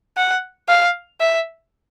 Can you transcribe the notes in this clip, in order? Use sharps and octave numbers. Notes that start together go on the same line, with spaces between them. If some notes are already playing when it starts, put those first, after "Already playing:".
F#5
F5
E5